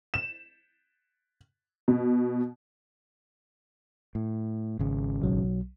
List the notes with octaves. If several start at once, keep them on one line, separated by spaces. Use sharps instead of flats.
E7
B2
A2
G#1 C#3
B1 F#3